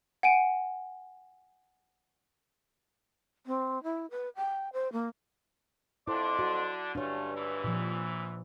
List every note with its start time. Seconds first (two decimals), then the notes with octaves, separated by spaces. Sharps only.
0.23 F#5 G#5 D7 D#7
3.46 C4
3.83 E4
4.11 B4
4.36 G5
4.73 C5
4.93 A#3
6.07 F2 D3 D4 E4 C6 D6
6.39 F#4
6.95 G2 A3 C#4 D4 F4 C#5
7.34 E2 G#2 E3
7.64 A#2 F3